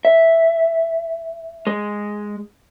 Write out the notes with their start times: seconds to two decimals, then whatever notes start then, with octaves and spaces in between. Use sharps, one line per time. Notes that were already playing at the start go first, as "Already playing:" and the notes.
0.05 E5
1.67 G#3